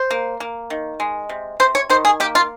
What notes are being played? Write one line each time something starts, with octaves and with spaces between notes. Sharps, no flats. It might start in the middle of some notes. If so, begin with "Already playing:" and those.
Already playing: C5
A#3
A#3
D#3
G#3
C3
C3 C5
C#5
D#3 C5
G#4
A#3 G4
F4